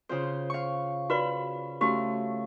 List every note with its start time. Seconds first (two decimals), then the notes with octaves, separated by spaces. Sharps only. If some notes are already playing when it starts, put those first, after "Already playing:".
0.09 C#3 F4 C5
0.50 F5 C#6
1.10 F#4 B4 D5 B5
1.81 A3 C#4 F#4 G4 F5